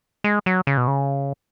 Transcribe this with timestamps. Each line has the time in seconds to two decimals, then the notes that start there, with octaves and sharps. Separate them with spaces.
0.24 G#3
0.46 F#3
0.67 C#3
0.77 B2
0.88 C#3